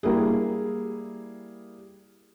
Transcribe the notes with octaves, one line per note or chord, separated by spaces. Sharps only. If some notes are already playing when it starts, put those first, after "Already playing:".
G3 A#3 E4 G#4